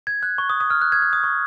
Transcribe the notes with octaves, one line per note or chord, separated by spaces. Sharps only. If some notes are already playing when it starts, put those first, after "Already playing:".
G#6
F#6
C#6
D#6
D#6
F6
F#6
G#6
F#6
D#6
C#6